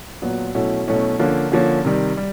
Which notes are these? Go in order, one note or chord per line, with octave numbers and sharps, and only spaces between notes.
A#2 F#3 B3
B2 F#3 A3 C#4 E4
B2 F#3 A3 C#4 E4
D3 F3 A#3 C#4
D3 F3 A#3 C#4
C3 D#3 G3
G3